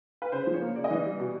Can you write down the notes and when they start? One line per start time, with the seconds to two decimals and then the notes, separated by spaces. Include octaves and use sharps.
0.22 B4
0.32 C#3 C5
0.47 F3
0.54 C#5
0.62 A#3
0.76 C#3 D5
0.84 D#5
0.91 E3 D5
1.05 G3
1.20 B2